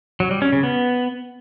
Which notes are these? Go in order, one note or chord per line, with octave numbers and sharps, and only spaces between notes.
F#3
G3
C#4
C#3
B3